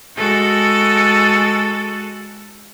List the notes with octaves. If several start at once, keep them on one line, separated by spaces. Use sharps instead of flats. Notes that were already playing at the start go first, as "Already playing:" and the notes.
G#3 F#4 A4